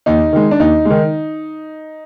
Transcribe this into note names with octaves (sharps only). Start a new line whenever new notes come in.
D#2 D#4
D#3 G#3
D4
D#2 D#4
G#3
D#3